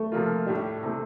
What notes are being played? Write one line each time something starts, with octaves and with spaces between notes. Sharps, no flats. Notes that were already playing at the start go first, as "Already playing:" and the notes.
Already playing: A3
C3 F3 A#3 F4
A2 G3 D4 G4
C3 E3 A3